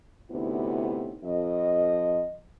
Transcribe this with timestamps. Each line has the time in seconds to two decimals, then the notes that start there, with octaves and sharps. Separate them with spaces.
0.30 D2 A2 C3 B3 D#4 E4
1.24 F2 D#5